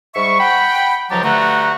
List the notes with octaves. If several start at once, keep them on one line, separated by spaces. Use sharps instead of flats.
G#2 G3 E5 C#6
F#5 G5 B5
C#2 F3 F#3 G4 A5 A#5
G2 D3 A3 F#4 F#5 A#5